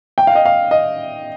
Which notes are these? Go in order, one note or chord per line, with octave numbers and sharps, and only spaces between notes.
G5
F5
D#5
F5
D#5